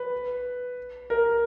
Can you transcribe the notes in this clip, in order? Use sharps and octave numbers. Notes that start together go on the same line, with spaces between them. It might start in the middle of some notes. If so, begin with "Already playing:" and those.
Already playing: B4
A#4